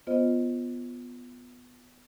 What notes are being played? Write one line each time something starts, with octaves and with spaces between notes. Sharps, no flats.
B3 F4 C5 D#5